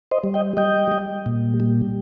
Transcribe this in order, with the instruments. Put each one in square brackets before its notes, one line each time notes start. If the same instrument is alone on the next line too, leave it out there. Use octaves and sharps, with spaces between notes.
[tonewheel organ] C5 D#5
G3
D#5 G5
G3 D#5 G5
G3
A#2
G3